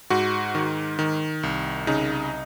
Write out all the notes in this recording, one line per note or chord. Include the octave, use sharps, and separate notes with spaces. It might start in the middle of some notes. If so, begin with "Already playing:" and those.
G#2 F#4
D#3
D#3
C2
C#3 D#4